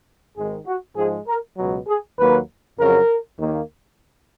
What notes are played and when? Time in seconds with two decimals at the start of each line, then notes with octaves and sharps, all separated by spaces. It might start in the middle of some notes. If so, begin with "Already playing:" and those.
0.36 G#1 G#2 D#3 G#3 G#4
0.66 F#4
0.96 G#2 F3 G#3 G#4
1.28 A#4
1.57 C#2 B2 F#3
1.88 G#4
2.18 D#2 D#3 F#3 A#3 B4
2.79 F2 C#3 F#3 A#4
3.39 D#2 D#3 A#3